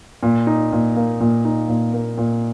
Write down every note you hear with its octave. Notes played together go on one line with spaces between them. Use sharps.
A#2
D#4
A#2
A#3
A#2
D#4
A#2
A#3
A#2